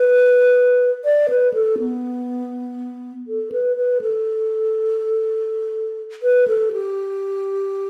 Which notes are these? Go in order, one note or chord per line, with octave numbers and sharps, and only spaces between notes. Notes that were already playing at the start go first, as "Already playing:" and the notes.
Already playing: B4
D5
B4
A4
B3
A4
B4
B4
A4
B4
A4
G4